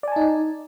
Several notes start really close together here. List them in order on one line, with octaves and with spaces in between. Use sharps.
D5 G#5 A5 D#4